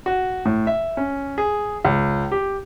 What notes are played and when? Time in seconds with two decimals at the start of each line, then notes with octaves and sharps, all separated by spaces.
0.06 F#4
0.45 A2
0.67 E5
0.97 C#4
1.38 G#4
1.85 C#2
2.32 G4